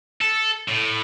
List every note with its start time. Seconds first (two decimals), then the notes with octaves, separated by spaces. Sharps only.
0.21 A4
0.69 A2